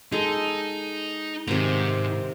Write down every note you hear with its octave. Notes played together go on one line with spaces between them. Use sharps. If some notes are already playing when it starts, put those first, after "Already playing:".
G#3 D#4 A4
G#2 C3 D#3 A#5